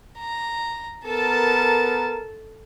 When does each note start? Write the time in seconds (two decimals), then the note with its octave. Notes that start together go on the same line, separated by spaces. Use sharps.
0.19 A#5
1.05 B3 A4 A#4 A5